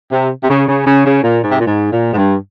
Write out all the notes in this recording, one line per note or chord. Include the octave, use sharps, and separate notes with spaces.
C3
C3
C#3
C#3
C#3
C#3
A#2
G#2
C3
A#2
G#2
A#2
G#2
G2